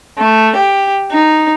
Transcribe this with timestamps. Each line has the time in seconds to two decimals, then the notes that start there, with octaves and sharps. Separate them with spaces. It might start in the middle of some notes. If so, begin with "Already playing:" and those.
0.19 A3
0.57 G4
1.12 D#4